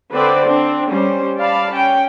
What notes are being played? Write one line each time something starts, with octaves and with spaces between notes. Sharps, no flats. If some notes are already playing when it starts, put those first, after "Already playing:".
D3 C4 B4 C5 D5
C4 D4
G3 C#4 C5
D5 F5 A5 B5
C#4 G5